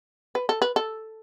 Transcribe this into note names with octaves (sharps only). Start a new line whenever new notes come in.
B4
A4
B4
A4